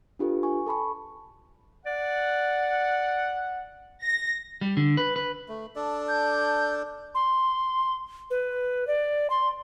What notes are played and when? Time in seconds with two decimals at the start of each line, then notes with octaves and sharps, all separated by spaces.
0.19 D4 F4 G4 A4 B4
0.43 G#5 C#6
0.67 A4 A5 B5 C#6
1.86 D5 F#5
4.04 A#6
4.61 G3
4.77 D3
4.97 B4
5.16 B4
5.48 A3
5.76 D4 A4 D5
6.09 G6
7.15 C6
8.30 B4
8.87 D5
9.30 C6